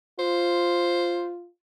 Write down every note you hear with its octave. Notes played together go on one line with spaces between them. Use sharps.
F4 C5